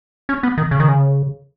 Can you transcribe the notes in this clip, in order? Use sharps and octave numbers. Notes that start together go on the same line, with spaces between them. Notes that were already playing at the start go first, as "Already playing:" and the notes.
C#4
B3
D#3
C#3
D#3
C#3